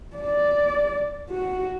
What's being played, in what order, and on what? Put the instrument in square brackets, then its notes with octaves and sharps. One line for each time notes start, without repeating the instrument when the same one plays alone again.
[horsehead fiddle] D5
F#4